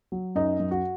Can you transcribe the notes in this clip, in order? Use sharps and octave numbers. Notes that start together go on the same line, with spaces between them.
F#3
F#2 D#4
F#2
F#4